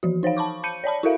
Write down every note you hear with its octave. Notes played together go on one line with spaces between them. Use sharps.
E3 F3 F#4
D#4 C5 C#5 F5
A5 B5 C#6 D6
A5 B5 G6 C#7 D#7
C#5 D5 A5 B5
E4 F#4 A4 A#4 E5 F5